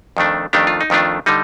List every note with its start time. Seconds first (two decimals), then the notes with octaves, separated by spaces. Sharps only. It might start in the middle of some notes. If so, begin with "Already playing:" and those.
0.17 F2 D#3 A3 D4
0.53 F2 D#3 A3 D4 G4
0.67 F4
0.81 D#4
0.90 F2 D#3 A3 D4 F4
1.26 D3 G3 D#4